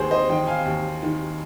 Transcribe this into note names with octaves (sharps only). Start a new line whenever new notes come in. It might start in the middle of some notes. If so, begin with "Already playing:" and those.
Already playing: D#2 G#4 C5
C5 D#5
D#3 D#5 G5
F5 G#5
D#2
D#3